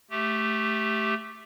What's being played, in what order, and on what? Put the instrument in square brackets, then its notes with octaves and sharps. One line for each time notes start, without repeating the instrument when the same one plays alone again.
[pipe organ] A3 G4